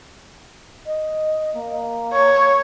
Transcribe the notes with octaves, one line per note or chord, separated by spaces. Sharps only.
D#5
A#3
C#5